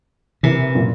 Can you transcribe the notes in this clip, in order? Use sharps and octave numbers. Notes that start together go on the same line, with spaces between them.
C3 E3 A#4
F#2 A#2